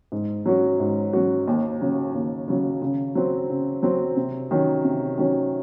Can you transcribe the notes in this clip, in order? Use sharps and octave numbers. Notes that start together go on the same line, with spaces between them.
G#2
F#3 C#4 F#4
G#2
F#3 C#4 F#4
D#2
C#3 F#3
D#2
C#3 F#3
C#3
F#3 C4
C#3
F#3 C4
C3
D#3 F#3 C#4
C3
D#3 F#3 C#4